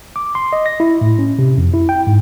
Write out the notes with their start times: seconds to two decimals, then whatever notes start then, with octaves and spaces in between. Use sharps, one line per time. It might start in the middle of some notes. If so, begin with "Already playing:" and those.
0.16 D6
0.35 C6
0.53 D#5
0.66 A#6
0.80 E4
1.01 A2
1.19 C#4
1.39 C3
1.58 F2
1.74 E4
1.89 G5
2.07 G#2